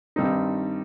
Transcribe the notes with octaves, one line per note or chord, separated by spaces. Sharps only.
G2 D#3 G3 C4 D#4